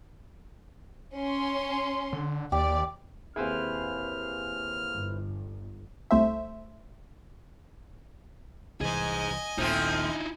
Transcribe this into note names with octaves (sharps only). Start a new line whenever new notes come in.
C#4 C6
D3
D#2 G4 D5
D#2 C4 E4 G#4 B4 C5 F6
G1
C2 A3 C5 E5
C2 E3 G#4 C5 D#5 G#5
D#1 A#1 D#2 F3 A3 C4 D#4 E4